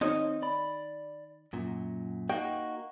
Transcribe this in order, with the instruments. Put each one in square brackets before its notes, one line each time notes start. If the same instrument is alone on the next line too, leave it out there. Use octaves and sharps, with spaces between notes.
[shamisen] D#3 C#5 D#5 [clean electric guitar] C4 D#4
[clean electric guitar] D5 B5
F#2 A#2
[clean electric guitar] A#3 D#4 F#4 [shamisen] G5